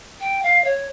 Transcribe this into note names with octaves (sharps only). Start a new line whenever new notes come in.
G5
F5
C#5